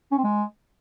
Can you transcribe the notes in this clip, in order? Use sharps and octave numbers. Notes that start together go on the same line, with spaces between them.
C#4
C4
G#3